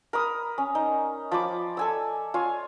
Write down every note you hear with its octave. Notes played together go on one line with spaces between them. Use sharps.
A#4 B5 D#6
C#4
D#4
F3 B5 D6
A4 G#5 E6
F4 C#5 G#5